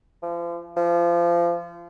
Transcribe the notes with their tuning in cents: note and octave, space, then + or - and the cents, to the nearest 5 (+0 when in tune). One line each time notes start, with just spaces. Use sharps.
F3 -35
F3 -25